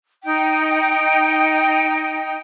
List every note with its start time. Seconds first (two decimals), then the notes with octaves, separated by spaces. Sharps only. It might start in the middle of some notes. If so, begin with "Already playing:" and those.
0.24 D#4 G5